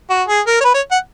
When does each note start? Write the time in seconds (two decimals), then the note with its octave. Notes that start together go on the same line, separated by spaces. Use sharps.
0.10 F#4
0.28 G#4
0.47 A#4
0.61 C#5
0.65 B4
0.74 C#5
0.92 F#5